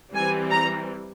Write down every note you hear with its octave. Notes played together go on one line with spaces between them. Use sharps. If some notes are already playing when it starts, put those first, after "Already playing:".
E3 G3 C4 G#5
A#5